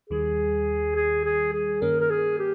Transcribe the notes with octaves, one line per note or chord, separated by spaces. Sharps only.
D#2 D#3 G3 G#4
G#4
G#4
G#4
G2 D#3 A#3 C#4 A#4
A#4
G#4
G4